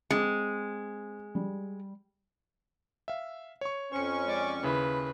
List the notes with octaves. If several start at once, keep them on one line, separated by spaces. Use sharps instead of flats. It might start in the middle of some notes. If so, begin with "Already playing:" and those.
G#3 C4
G3
E5 F5
C#5 C#6
F2 C#4 C5 C#6 C#7
G#3 D5
D#2 C#3 E4 B4